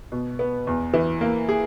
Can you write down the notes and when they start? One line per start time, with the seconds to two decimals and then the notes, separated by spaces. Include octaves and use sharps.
0.12 B2
0.39 B3
0.67 E2
0.93 E3
1.21 A#3
1.49 G#4